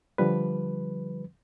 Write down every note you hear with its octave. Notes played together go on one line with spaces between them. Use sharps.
D3 F3 G3 B4